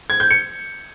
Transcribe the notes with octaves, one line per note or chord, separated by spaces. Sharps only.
G#6
G6
C#7